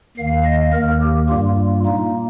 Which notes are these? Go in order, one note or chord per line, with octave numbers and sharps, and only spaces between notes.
D#2 D#3 A#3 F5
D#5
D#2 D#3 A#3 A#4
G4
G2 G3 A#3 F4
A#2 A#3 D#4